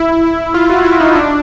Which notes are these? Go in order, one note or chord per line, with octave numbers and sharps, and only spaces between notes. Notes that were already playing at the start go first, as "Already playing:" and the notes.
Already playing: E4
E4
F4
F#4
E4
D#4
D4